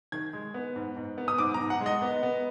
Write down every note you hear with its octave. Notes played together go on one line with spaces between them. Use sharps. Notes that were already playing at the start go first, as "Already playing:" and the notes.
D#3 G#6
G#3
B3
G#2
G#2
B3
D#6
G#2 D6
A#5
G#2
F#5
G#3
D#5
B3
B3